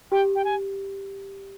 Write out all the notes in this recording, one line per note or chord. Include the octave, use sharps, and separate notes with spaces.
G4 G5
G5
G#5